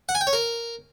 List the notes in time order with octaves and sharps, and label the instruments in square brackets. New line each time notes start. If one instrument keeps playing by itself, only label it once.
[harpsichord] F#5
G#5
G5
C#5
A#4